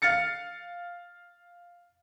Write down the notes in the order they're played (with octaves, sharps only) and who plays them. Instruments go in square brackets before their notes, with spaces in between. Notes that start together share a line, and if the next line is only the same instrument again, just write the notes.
[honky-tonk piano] F5 F6 A6 C#7